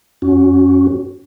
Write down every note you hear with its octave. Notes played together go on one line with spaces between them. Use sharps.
F#2 C#4 F#4